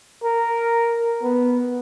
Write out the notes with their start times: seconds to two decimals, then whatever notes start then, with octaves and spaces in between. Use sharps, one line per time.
0.24 A#4
1.23 B3